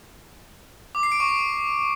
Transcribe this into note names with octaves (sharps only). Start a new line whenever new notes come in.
D6
C7
D7
C#6
D7